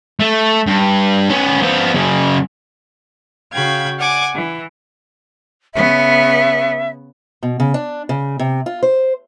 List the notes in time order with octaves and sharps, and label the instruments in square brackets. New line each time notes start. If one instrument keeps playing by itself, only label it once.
[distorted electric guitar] A3
G2
B3 C#4
F3 B3
F#2 C#3
[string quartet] C#3 F#4 F5 G5 B5 G#6
D5 F#5 G#5 D6
E3
[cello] C#3 B3 [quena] E5
[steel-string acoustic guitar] B2
C#3
D4
C#3
C3
F4
C5